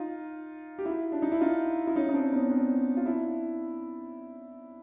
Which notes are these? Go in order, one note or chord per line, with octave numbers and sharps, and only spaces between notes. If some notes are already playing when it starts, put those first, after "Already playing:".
Already playing: D#4 F4
G4
E4 F#4
D4
D#4
E4
D#4 F4
E4
C#4 D#4
D#4
C4 D4
B3 C#4
C4 D4
F4
D4 E4